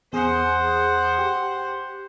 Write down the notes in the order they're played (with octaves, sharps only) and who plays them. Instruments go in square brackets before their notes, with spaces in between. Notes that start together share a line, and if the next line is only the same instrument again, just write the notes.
[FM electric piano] E2 G#4 D#6 [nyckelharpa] C5 F#5
[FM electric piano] G4